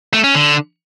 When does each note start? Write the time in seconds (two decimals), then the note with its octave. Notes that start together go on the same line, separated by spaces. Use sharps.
0.13 A3
0.24 C#4
0.35 D3